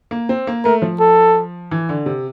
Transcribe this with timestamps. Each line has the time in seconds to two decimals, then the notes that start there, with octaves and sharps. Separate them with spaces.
0.11 A#3
0.29 C4
0.47 A#3
0.64 A3 A#4
0.82 F3
1.00 A4
1.71 E3
1.89 D3
2.06 C3